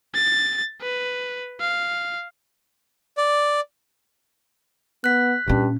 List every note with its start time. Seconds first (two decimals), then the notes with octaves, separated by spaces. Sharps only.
0.14 A6
0.81 B4
1.60 F5
3.17 D5
5.04 B3 F#6 B6
5.48 G2 A#2 C#4